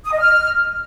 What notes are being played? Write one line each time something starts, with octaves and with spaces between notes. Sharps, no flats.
D#6
D#5
F6